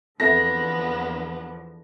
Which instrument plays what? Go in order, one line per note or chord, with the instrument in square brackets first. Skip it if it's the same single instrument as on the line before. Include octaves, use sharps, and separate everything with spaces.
[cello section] E2 D3 F3 [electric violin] B3 [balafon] C4 A4 E5 [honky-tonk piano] A#6